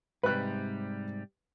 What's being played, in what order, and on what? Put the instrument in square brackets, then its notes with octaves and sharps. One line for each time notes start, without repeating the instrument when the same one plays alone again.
[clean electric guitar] G#2 C3 G3 [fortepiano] B4 F#6